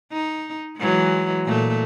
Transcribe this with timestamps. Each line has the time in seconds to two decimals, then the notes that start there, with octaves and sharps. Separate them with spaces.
0.12 D#4
0.78 E3 F#3 G#3
1.46 A#2 A3